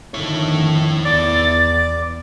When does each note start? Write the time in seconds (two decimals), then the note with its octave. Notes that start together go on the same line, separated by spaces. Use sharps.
0.14 F2 D3 D#3 E4 C#5
1.05 E2 D5 A6